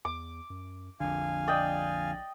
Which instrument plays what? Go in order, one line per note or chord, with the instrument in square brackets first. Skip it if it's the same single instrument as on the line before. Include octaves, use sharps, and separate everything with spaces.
[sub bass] E2 [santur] D6
[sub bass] F#2
[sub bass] A#1 [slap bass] F2 D3 [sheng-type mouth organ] F5 G#5
[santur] D5 D#5 G5